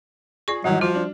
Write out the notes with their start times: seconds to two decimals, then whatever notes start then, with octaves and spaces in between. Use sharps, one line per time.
0.48 F4 G#4 D5 C#6
0.64 G#2 D#3 E3 F#3 G3
0.81 F3 F#4 F6
0.95 D4